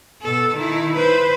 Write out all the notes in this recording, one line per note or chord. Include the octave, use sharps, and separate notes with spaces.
B2 A4
D#3 E4
B4 C5